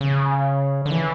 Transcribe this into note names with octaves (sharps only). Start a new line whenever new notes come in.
C#3
D3
E3